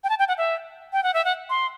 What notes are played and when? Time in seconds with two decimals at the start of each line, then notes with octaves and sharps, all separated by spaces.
0.04 G5
0.09 A5
0.19 G5
0.28 F#5
0.38 E5
0.93 G5
1.03 F#5
1.14 E5
1.25 F#5
1.50 C6